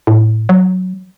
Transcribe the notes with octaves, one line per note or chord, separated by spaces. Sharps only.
A2
F#3